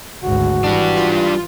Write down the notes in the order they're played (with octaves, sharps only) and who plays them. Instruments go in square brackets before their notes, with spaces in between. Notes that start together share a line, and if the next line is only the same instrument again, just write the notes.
[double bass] G#1 D2 [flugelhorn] F#4
[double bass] E3 [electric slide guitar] G3 D4
[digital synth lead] F4